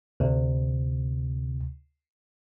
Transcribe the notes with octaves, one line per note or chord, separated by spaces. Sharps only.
D2 C3